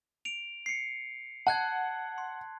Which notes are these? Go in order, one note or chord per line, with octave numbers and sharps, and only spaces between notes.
D7 F7
C7 C#7
F#5 A5 F#6 G#6
C6